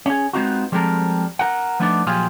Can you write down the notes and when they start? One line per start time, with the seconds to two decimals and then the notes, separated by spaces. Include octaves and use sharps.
0.06 C#4 G#4
0.33 G#3 B3 C4 D#4 F4 F#4
0.72 F3 G3 G#3 C4 A4 A#4
1.39 A#4 F#5
1.80 F3 A3 B3 D4 D#4 D5
2.07 A#2 F3 F#3 F4 G4 G#4